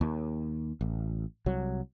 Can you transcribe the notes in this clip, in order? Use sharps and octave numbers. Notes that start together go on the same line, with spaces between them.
D#2
A1
C2 F#3